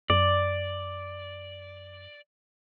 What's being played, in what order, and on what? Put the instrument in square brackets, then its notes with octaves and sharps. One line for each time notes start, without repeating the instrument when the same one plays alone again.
[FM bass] F#2 [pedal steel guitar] D5